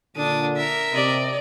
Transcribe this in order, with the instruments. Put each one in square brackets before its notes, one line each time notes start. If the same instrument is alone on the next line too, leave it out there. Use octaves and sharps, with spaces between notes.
[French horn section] A#2 D3 [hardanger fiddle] D4 D#6
[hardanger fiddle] A#4 E5
[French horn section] C3 [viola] D5 D#5